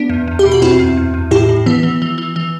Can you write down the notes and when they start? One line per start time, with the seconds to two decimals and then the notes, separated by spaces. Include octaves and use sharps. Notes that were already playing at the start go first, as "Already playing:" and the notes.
Already playing: B3 D4
0.10 E2
0.28 E2
0.39 G4
0.45 B2
0.52 F#4
0.62 E2 C4 E4
0.79 E2
0.97 E2
1.14 E2
1.31 A2 E4 G4
1.49 A2
1.66 E3 B3
1.83 E3
2.02 E3
2.18 E3
2.36 E3